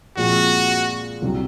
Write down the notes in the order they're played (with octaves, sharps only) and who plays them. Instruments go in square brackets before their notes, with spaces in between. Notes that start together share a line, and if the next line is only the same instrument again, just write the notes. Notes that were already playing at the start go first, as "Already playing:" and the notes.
[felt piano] A#2 F3 G#3 C4 [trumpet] F#4
[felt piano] C2 C3 F#3 C4 F#4